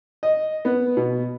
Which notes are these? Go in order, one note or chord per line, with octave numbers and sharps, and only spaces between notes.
D#5
B3
B2